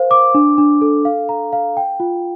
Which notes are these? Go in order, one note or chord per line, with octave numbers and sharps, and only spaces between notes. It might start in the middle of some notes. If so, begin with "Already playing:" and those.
Already playing: A#4 C5 F5
D6
D4
D4
A4
F5
A#5
F5
G5
F4